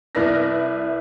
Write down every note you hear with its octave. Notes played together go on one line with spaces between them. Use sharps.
C2 E4 B4 D5 F6 A#6